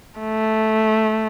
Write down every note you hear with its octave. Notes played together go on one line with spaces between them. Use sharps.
A3